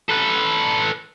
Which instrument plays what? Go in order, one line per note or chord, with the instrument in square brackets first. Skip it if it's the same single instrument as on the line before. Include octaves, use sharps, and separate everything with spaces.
[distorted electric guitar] A4 B4